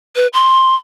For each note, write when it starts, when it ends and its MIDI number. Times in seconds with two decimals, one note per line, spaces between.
0.16 0.27 71
0.33 0.75 84